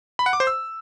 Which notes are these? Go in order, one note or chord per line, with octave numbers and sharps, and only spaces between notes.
B5
F#5
D6
C5
E6